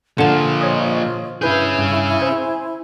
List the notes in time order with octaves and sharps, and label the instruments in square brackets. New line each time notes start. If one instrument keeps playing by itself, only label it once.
[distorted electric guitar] A#2 F3 [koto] D3 A5 [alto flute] F4
[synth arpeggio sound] C5 C#5 D#5
[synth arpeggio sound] G2 B4 G6 [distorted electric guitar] C#4 G#4 [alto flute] E4
[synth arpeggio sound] G2
C5 G#5